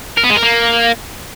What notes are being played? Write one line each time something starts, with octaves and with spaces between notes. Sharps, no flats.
A#4
B3
G#3
A#4
A#3